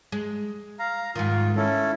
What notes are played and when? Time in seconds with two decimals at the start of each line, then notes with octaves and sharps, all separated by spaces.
0.12 G#3
0.79 F5 A#5
1.15 G#2 D#3 F4
1.56 C#4 E4 A4